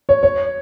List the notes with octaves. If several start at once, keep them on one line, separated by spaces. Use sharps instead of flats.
C#5
C#5